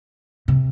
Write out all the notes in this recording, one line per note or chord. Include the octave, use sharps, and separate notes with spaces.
C3